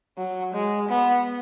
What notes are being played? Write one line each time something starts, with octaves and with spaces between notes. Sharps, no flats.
F#3
G#3
B3